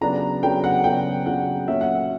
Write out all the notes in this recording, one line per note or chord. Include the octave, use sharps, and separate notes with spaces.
C#3 F#3 B3 D4 A#5
C#3 F#3 B3 D4 G5
F#5
C#3 F#3 B3 D4 G5
C#3 F#3 B3 D4 F#5
A#2 F#3 C#4 E5
F#5
E5